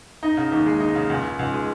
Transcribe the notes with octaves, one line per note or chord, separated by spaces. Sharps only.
D#4
C#3
D#2
G#3
D#4
C#3
C#2
C#3
C#2
G#3